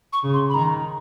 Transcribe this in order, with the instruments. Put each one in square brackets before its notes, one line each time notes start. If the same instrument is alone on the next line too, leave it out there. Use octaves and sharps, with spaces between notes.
[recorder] C#6
[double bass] C#3
[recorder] C6
B5
[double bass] D#3 [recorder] A#5